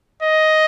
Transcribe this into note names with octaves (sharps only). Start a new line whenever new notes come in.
D#5